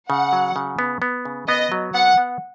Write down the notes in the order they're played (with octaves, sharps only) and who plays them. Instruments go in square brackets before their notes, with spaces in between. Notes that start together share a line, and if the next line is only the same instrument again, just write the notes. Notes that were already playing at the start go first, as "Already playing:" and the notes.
[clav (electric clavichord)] C#3 [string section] F#5
[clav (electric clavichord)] F#3
C#3
B3
B3
C#3
[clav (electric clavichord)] B3 [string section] D#5
[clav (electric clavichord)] F#3
[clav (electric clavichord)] B3 [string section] F#5
[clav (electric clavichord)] B3